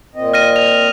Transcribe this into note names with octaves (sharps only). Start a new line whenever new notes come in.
A#2 C4 D#5
F6 A#6 D#7
F7